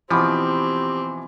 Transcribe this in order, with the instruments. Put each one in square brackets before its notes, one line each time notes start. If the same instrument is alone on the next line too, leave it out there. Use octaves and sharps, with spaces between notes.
[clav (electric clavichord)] B2 F3 [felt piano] E3 B5 D6 [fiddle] C4 [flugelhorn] G4